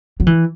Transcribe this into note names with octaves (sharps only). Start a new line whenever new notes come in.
F#3
E3